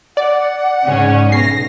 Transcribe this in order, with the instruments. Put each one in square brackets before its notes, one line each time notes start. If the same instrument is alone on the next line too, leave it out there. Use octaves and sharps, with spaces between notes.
[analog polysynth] D5 [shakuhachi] F#5
[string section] G#2 C#3 C#4
[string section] B1 A#6 [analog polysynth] C7